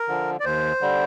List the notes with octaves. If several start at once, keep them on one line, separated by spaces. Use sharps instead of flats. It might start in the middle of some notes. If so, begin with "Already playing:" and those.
Already playing: A#4
D3 F3
D5
D#2 C5
D3 G3